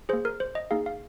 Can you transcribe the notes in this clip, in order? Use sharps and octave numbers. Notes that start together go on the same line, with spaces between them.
A#3 G#4 C5
A#4
C5
D#5
A#3 D#4 G#4 F5
F5